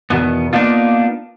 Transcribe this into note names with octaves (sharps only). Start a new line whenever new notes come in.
E2 B2 D#3 B3
A#3 B3 D4 D#4 F4